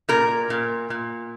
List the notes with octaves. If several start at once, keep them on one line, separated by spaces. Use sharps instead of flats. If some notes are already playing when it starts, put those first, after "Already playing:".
A#2 A#4
A#2
A#2